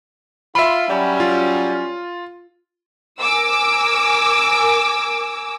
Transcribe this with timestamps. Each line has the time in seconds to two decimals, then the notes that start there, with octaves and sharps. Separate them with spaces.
0.55 F4 E5 B5
0.88 F#3 G3 C#4
1.20 F4
3.21 A#4 G#5 D6 E6